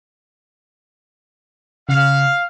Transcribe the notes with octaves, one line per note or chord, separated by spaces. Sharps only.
C#3 F5